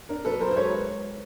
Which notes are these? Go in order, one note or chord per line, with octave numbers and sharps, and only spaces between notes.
D4 A#4
F#3 A4 B4
F#3 A#4 C5
C5
G#3 B4 C#5